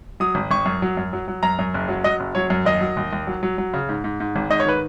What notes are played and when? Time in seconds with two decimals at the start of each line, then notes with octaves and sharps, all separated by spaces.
0.20 F#3 D#6
0.35 G#1
0.51 G#1 C#6
0.66 F#2
0.82 F#3
0.97 F#2
1.13 F#3
1.28 F#3
1.43 F#2 A#5
1.59 F#2
1.74 F#1
1.89 F#3
2.04 F#3 D#5
2.20 F#1
2.35 F#3 C#5
2.50 F#2
2.65 D#2 D#5
2.81 F#3
2.97 D#2
3.13 D#2
3.27 F#3
3.43 F#3
3.58 F#3
3.74 C#3
3.89 G#2
4.04 G#2
4.20 G#2
4.36 G#1
4.50 G#2 D#5
4.60 C#5
4.65 D#3 B4